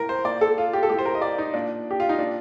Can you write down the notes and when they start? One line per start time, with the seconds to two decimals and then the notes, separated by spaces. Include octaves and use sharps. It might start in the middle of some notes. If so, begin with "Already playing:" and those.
Already playing: A2 A#4
0.09 C5
0.24 A#2 D5
0.41 A4
0.58 F4
0.73 G4
0.83 A4
0.90 A2 G4
0.99 C5
1.05 A#4
1.15 D#5
1.22 D5
1.38 D#4
1.54 A#2 D4
1.91 G4
2.00 F4
2.09 D#4
2.18 A#2 D4